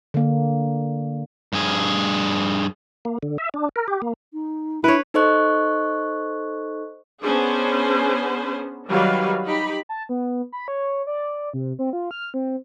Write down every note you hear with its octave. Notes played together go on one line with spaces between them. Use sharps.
D3 A#3
G2 G#4
A#3
D3
E5
D4
A#4
G4
A#3
D#4
D4 E4 B4 C#5
D#4 A4 C5 D#5 C#6 F#6
B3 C#4 D4 G#4 C5
D#3 F#3 G3 B4 F5
D#4 G4 B5
A5
B3
B5
C#5
D5
C3
C4
F4
F6
C4